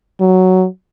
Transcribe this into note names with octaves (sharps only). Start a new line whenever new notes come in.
F#3